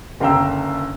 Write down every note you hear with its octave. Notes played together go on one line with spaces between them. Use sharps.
F#1 D3 F5 G5 A#5 E6